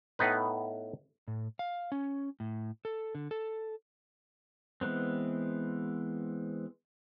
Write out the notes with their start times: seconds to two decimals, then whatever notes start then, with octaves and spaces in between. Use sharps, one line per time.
0.19 A2 B3 D#4 B4
1.28 A2
1.59 F5
1.92 C#4
2.40 A2
2.85 A4
3.15 D3
3.31 A4
4.81 E3 G#3 B3 C4